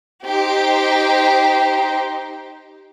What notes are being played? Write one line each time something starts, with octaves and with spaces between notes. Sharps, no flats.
D#4 G4 C5